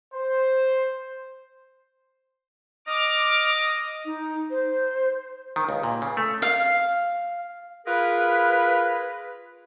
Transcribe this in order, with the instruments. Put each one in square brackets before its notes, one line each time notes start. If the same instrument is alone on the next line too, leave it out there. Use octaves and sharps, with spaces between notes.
[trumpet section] C5
[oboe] D#5 [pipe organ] D6 F6
[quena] D#4
C5
[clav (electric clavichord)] D#3
C#2
A#2
C#3
A3
[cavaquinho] F5
[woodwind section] F4 G#4 A#4 B4